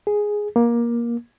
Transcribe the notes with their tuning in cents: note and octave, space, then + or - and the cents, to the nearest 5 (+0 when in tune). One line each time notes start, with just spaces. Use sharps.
G#4 +0
A#3 +20